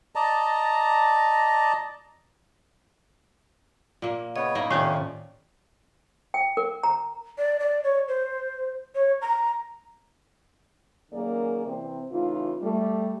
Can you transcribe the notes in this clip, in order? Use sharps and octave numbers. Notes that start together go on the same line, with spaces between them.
D5 D#5 A5 A#5
A#2 A#3
C#3 B3 C#5 D#5
A#3 D#4 E4
D#2 A2 C3 D#3 F3 C#4 G4 D5
G5
A#4
A#5
D5
D5
C#5
C5
C#5
A#5
F#2 D#3 A#3 G#4 A#4 D5
C3 E3 C4
C#3 E3 A3 D#4 F4
G3 A3